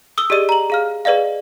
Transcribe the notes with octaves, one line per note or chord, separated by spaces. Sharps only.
D#6 E6 G7
G4 G#4 D5 D#5 D#7
A#5 F#7
G#4 F5 F6
G#4 B4 D5 D#5 F5